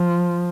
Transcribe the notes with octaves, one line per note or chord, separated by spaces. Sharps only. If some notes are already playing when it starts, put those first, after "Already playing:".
Already playing: F3